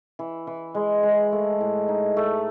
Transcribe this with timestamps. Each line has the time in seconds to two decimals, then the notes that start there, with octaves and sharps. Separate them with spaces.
0.19 E3
0.47 E3
0.75 G#3
1.03 G#3
1.32 A3
1.60 A2
1.88 D#4
2.17 A3